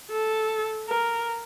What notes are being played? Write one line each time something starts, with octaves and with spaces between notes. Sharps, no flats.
A4
A#4